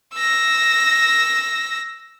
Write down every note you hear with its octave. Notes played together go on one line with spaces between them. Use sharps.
E6 A#6